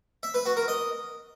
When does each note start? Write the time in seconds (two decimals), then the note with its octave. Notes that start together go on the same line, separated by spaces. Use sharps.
0.23 E5
0.34 B4
0.46 F#4
0.57 A#4
0.68 D#5